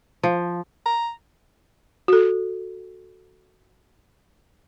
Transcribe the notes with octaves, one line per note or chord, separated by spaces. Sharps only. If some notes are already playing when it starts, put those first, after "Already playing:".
F3
A#5
F#4 A4